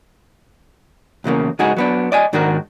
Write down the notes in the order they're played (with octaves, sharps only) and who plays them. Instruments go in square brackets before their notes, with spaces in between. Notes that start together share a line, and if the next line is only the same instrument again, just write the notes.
[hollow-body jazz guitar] B1 E2 C#3 A#3
C#2 G#3 D#4 F#4 G#4
F#3 B3 D4
D5 D#5 G#5
G#2 D#3 D4 F#4 A#4